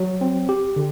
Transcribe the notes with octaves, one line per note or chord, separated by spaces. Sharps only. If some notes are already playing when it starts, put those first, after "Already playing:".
Already playing: F#3
C4
G4
D3